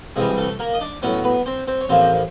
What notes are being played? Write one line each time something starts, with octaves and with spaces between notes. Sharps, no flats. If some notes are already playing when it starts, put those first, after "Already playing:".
C2 C3 E3 G3 G#3 G#4
G#4
A3 A4
A#3 A#4
D#5
D4 D5
A2 F#3 B3 C#4 C#5
B3 B4
C4 C5
C4 C5
C#5
A1 A2 F3 A#3 C4 C5